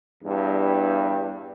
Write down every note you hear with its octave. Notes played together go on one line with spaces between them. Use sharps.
E2 G2